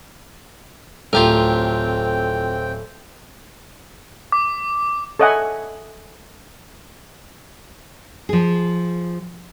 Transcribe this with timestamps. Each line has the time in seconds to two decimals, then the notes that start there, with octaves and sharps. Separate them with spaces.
1.13 D1 C4 F4 G4 A4 A#4 G5
4.32 D6
5.19 A4 C#5 D#5 E5 F#5 G#5
8.29 F3 G#4